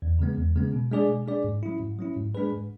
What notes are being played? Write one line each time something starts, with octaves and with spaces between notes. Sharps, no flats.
E2
C#3 G#3 B3
E2
C#3 G#3 B3
B2
G#3 D4 G#4 D5
B2
G#3 D4 G#4 D5
G#2
F#3 C#4 E4
G#2
F#3 C#4 E4
G#2
G#3 D4 G#4 B4
G#2